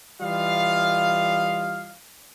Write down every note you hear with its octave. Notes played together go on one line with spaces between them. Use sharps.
E3 G3 F4 D#5 F5